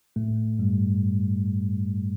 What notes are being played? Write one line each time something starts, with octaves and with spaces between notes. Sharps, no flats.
A2 A3
G2 G3